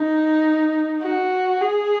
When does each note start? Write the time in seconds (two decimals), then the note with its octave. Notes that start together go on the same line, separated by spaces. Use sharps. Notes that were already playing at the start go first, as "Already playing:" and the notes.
Already playing: D#4
1.03 F#4
1.61 G#4